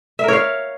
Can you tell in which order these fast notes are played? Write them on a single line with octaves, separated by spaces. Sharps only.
E5 A#4 C#5 F5